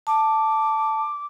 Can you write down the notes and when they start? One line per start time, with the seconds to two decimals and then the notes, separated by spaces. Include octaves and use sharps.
0.07 A5 D6